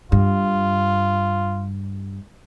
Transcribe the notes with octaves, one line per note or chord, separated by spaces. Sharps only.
G2 F4